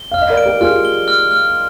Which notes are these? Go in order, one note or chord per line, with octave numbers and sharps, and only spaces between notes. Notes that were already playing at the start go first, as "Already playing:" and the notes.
Already playing: G7
F5 F6
D#5
A#4 D5
D7
G4 A#4
F4 G#4 F6
G7
F6
F6